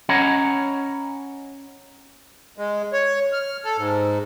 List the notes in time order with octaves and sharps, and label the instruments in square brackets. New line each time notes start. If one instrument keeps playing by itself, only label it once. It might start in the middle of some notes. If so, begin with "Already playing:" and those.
[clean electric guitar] C#4 C#5 D#5 F#5 A#5 B5
[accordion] G#3
C#5
F6
A4
G#2